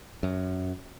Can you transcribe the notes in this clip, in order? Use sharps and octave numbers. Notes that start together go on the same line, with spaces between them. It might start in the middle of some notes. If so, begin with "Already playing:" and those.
F#2